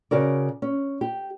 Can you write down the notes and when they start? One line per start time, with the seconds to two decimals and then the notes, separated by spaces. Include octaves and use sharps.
0.11 C#3 F#4 A#4 D5
0.62 C#4
1.01 G4